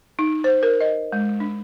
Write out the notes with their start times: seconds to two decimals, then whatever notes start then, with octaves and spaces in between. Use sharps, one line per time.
0.19 D#4
0.44 C5
0.63 A#4
0.81 D#5
1.12 G#3
1.40 D4